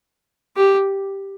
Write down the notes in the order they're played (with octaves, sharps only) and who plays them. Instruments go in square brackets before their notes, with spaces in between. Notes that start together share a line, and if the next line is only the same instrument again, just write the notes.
[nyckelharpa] G4